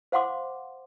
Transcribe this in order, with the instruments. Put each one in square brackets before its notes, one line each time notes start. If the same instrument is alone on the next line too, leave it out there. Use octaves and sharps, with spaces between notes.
[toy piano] C5 F5 F#5 C6 D6